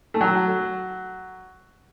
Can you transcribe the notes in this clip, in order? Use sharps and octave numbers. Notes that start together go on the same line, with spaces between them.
A3
F#3